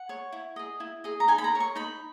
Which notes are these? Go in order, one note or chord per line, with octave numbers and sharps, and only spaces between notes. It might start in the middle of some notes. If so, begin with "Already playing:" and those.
Already playing: F#5
C#5
E4
G#4 D#5
E4
G#4 D#5
A#5
D#4 G#5
B5
A#5
A#4 C#5
C#6
D#4 B5